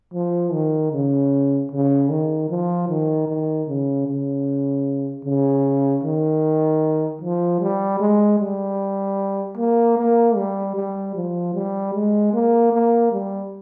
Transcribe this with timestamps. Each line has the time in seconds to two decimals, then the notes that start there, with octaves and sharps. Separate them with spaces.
0.14 F3
0.53 D#3
0.93 C#3
1.72 C#3
2.10 D#3
2.50 F3
2.89 D#3
3.28 D#3
3.69 C#3
4.08 C#3
5.25 C#3
6.04 D#3
7.22 F3
7.61 G3
8.00 G#3
8.40 G3
9.58 A#3
9.98 A#3
10.36 G3
10.76 G3
11.15 F3
11.55 G3
11.94 G#3
12.34 A#3
12.73 A#3
13.12 G3